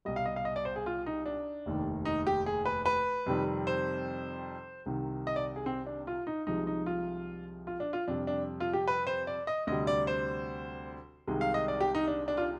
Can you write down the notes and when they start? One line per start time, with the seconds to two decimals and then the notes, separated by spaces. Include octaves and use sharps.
0.05 C2 B2 G3 D#5
0.16 F5
0.26 D#5
0.36 F5
0.45 D#5
0.56 D5
0.65 C5
0.76 G#4
0.86 F4
1.06 D#4
1.26 D4
1.66 F1 D#2 D#3
2.05 D#4
2.27 G4
2.46 G#4
2.65 B4
2.86 B4
3.26 F2 C3 D#3 G3
3.67 C5
4.86 C2 C3 D#3
5.27 D#5
5.36 D5
5.56 G#4
5.66 C4
5.86 D4
6.07 F4
6.27 D#4
6.47 C2 C3 F3 G#3 D#4
6.67 D#4
6.86 F4
7.67 F4
7.80 D4
7.93 F4
8.08 F2 C3 G3 D4
8.27 D4
8.60 F4
8.73 G4
8.88 B4
9.07 C5
9.27 D5
9.47 D#5
9.67 D2 C3 G3 D#5
9.87 D5
10.07 C5
11.28 C2 C3 D#3 G#3
11.41 F5
11.54 D#5
11.68 D5
11.80 G4
11.95 D#4
12.08 D4
12.28 D4
12.37 F4